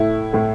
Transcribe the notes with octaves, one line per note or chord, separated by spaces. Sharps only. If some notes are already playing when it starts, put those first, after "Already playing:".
Already playing: A2 A3 E4
A2 A3